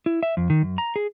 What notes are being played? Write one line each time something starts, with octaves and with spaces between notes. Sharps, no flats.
E4
E5
F2
D#3
F#2
A#5
G#4